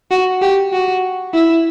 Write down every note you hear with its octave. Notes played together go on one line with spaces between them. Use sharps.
F#4
G4
F#4
E4